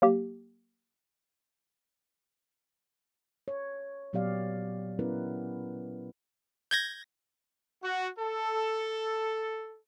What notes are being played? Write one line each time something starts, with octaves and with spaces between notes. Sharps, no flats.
F#3 A#3 G4
C#5
A#2 F#3 B3 G4 D5 F5
B3 C#4 E4 A#4 B4
G6 G#6 A#6
F#4
A4